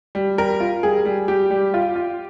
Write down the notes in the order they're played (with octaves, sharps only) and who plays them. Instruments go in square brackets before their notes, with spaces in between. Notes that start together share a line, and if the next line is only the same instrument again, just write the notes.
[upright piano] G3
G3 A#4
F4
G3 G#4
G3
G3 G4
G3
F4
F4